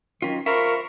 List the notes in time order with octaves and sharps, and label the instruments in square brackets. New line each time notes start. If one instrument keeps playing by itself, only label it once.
[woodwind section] D#3 [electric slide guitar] F#3 C#4 F4
[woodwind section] F4 B5 C#6 [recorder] A#4 [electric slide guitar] C5 E5